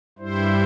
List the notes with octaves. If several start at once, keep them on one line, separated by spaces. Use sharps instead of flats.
G2 G3 E4 C5